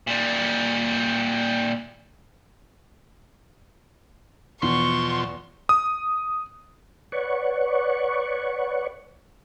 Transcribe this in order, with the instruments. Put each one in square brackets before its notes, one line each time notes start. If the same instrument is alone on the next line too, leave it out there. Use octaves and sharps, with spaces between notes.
[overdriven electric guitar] A#2 G3
[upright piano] E2 [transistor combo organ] B2 F3 [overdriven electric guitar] C6 [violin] C#6
[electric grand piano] D#6
[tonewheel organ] B4 C#5 D5 F#5 C#6